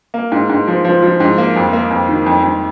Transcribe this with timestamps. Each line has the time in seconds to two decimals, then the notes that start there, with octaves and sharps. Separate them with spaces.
0.14 A#3
0.32 G#2
0.49 G#2
0.67 F3
0.85 F3
1.03 F3
1.20 G#2
1.38 A#3
1.56 F2
1.73 A#3
1.91 F2
2.09 D#3
2.26 F2
2.43 F2